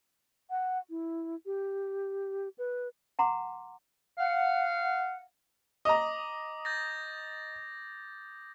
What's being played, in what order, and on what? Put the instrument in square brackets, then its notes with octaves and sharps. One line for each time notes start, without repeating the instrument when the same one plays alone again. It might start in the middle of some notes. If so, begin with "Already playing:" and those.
[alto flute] F#5
E4
G4
B4
[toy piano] F#5 A#5 C6 D6
[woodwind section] F5 F#5
[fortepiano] D#5 A#5 [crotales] D6 D#6
[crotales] G6 A6 A#6